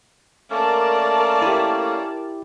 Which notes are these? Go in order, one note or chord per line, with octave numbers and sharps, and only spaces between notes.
A3 A#3 C#4 A#4 D5 A5
E4 G4